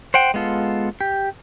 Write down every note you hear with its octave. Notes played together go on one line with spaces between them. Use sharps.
C5 F#5 G5
G#3 B3 F4 A4
G4